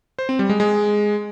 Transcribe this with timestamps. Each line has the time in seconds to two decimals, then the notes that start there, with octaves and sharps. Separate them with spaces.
0.19 C5
0.29 C4
0.39 G3
0.49 G#3
0.60 G#3